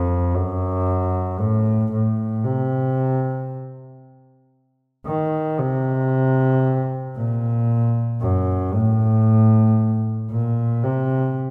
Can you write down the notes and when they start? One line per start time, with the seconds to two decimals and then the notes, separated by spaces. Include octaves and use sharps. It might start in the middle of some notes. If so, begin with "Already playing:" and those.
Already playing: F2
0.34 F#2
1.40 A2
1.92 A2
2.44 C3
5.06 D#3
5.59 C3
7.17 A#2
8.21 F#2
8.73 A2
10.31 A#2
10.84 C3